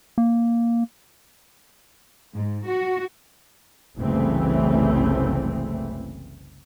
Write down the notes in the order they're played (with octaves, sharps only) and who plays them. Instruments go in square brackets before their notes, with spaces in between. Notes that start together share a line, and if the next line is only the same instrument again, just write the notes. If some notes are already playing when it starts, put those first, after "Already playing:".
[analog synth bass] A#3
[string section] G#2
F#4
[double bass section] F#1 C2 C#3 E3 A3 C4